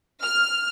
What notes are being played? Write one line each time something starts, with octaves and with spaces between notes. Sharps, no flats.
F6